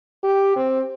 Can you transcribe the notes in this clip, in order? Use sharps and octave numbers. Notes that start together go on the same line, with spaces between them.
G4
C4